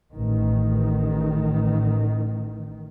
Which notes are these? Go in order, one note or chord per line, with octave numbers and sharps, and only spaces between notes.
A1 D#3